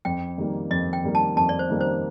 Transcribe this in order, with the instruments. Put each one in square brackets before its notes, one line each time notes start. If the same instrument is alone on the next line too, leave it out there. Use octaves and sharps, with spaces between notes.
[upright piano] F2 [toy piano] G5
[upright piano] D#3 G3 A#3
[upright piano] F2 [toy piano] D#5
[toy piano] G5
[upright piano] D#3 G3 A#3
[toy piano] A5
[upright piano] F2 [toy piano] A5
[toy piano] D5
C5
[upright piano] D#3 G3 A#3
[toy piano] C5